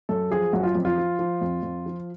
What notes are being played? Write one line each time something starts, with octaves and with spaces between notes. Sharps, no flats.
F#2 A4
F3 G#4
F#2 F#4
F4
F2
F4
F3
F3
F2
F2
F3